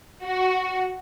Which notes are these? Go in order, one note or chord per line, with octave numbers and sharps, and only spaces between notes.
F#4